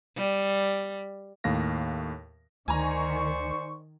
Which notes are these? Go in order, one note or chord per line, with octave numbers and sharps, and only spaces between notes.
G3
D#2 A2 F5 A#6
D2 D#3 C5 D5 G#5 A#5 C#6